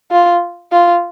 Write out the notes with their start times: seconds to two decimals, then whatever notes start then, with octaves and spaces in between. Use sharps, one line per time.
0.11 F4
0.72 F4